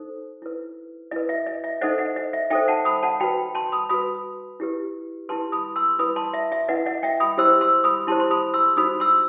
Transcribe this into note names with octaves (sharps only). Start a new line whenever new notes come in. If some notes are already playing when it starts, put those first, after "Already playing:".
Already playing: D#4 A4 C5
E4 B4
E4 B4 D#5
E5
D#5
E5
D#4 A4 C5 D#5 F#5
D#5 F#5
D#5
E5
D#4 A4 C5 E5 G5
F#5 A5
B5 D#6
F#5 A5
F#4 B4 G5 B5
A5 C6
B5 D#6
F#4 B4 B5 D#6
E4 G4 B4
E4 G4 B4 A5 C6
B5 D#6
C6 E6
E4 B4 B5 D#6
A5 C6
E5
E5
E4 B4 D#5 F#5
D#5 F#5
E5 G5
B5 D#6
E4 G4 C5 C6 E6
C6 E6
B5 D#6
E4 G4 C5 A5 C6
C6
B5 D#6
C6 E6
D#4 F#4 C5 B5 D#6
C6 E6